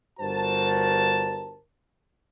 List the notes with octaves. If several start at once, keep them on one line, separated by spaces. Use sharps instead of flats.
G1 G2 F#4 A#4 C5 A5